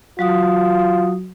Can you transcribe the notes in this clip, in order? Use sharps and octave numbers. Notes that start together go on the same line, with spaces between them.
F#3 F4 F#4 D#6